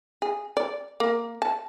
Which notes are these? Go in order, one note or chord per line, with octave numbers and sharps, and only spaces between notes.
G#4
D5
A#3
A5